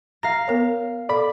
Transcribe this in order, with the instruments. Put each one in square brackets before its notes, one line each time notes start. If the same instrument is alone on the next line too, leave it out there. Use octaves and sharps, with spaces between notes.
[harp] F5 A#6 [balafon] A#5
[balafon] B3 A#4 C#5
[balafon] A4 D6 [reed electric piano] D5 B5